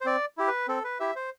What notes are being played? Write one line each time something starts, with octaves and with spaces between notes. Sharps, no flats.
C5
C4 D5
E4 G4
B4
C4 A4
B4
E4 G4 E5
C5